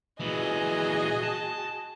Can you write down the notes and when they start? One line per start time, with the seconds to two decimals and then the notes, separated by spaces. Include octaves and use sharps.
0.20 A#2 E3 F#4 G#4 D#5
1.24 A5